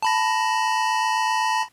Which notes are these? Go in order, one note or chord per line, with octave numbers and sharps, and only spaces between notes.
A5 B5 A#6